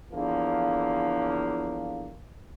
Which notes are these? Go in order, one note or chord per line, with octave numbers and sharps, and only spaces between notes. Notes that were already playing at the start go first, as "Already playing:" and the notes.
E2 D3 F3 A#3